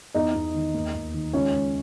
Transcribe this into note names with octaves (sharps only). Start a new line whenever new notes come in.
E2 D#4 D#5
E2
D#3
D#2
D#2
D#3
C#2 C#4 C#5
C#2